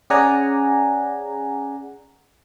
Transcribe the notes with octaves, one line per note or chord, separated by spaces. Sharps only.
C#4 G#4 D5 F#5 G#5 A#5